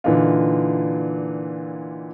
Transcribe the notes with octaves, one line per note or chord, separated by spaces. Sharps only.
A#2 D3 E3 D#4 F4